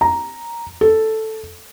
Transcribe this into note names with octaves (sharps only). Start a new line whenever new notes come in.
A#5
A4